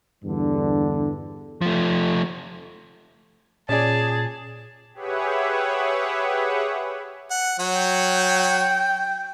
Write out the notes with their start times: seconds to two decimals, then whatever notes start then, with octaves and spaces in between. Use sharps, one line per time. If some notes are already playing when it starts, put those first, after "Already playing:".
0.23 E2 G2 D3
1.61 F3 A3
3.69 A#2 C#4 G#4 D5 A5
4.94 G4 G#4 B4 C#5 E5 F#5
7.30 F#5
7.59 F#3 C#5 F#5
7.75 G5